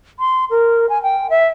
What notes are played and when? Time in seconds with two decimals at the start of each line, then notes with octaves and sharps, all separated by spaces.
0.19 C6
0.50 A#4
0.89 G#5
1.03 G5
1.30 E5